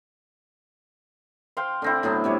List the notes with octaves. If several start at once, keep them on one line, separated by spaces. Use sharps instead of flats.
C5 F5 G5 C6
D3 C4 E4
A2 F#3 B3
C3 G3 C#5